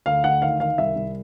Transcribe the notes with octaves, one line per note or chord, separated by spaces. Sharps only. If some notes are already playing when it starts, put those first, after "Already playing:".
D2 F5
D2 F#5
D#3 F5
D#3 F5
C2 E5
C2